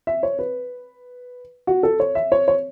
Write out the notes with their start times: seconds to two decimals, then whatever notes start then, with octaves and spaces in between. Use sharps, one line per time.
0.07 E5
0.23 C#5
0.39 B4
1.67 F#4
1.83 A4
2.00 C#5
2.15 E5
2.32 C#5
2.48 C#5